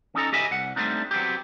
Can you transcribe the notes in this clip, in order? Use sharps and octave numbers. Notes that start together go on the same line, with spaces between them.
C#4 D#4 A4 A#5
G4 A4 D#5 E5 G#5 B5
C2 F#5
G3 A3 C4 D4 D#4
F#3 B3 C4 G4